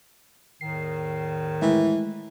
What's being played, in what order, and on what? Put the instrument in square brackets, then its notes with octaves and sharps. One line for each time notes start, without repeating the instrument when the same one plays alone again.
[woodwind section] E2 A2 D#3 [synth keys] C7
[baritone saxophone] E3 [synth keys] G#3 A3 E4